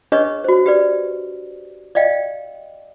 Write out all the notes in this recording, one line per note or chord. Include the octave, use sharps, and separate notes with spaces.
D4 G#4 B4 C#5 D#5 C#6
F#4 C5
G4 B4 D5
D5 D#5 F5 G5